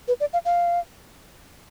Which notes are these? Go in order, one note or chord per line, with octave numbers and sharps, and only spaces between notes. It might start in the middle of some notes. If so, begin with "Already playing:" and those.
B4
D5
F5
F5